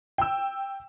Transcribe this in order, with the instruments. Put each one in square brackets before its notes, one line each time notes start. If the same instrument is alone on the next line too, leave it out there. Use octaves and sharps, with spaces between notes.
[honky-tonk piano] G5 E6